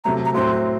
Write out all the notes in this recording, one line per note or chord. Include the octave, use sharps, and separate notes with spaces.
C3 F#3 A3 A#5
A#5
A2 F#3 C4 C6